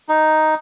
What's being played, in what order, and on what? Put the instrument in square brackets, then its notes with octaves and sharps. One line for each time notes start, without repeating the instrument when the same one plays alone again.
[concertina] D#4